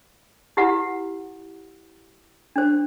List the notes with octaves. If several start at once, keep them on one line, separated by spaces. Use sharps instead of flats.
E4 F4 G4 B4 F#5
D4 C5